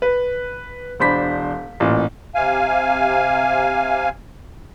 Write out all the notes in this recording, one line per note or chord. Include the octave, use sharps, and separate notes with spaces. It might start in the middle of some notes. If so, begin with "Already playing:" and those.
B4
E1 D4 C5 B5 B6
A1 A#2
C3 F5 G#5